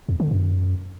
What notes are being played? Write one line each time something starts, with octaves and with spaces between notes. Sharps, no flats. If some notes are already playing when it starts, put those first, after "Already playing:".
E2
D3
F#2